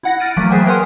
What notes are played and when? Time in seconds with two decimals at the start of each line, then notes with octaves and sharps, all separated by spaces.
0.03 E4 F#5 A#6
0.20 F6 A6 D7 D#7
0.37 E3 F#3 A3 A#3 B6
0.50 G#4 B4 C5 E5 G5 G#5
0.67 A#4 B4 C#5 F#5 G#5 C6